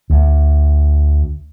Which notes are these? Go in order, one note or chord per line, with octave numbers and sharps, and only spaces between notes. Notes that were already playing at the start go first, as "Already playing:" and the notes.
D2